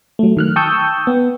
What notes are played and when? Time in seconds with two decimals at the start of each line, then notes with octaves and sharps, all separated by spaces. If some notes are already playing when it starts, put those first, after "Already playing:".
0.19 F#3 A3
0.37 D#3 F6 F#6
0.56 G5 A5 C#6 D#6 E6 G6
1.07 B3